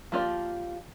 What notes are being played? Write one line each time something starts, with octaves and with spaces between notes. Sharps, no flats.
F3 A#3 F4 G4 D5